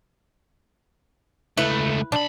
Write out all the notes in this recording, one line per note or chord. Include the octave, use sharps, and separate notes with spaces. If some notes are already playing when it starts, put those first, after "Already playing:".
C#2 A3 E4 B4
B1 D4 B5